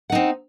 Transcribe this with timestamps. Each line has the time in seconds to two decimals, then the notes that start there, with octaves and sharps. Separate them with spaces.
0.10 F#5
0.12 D#4
0.15 C4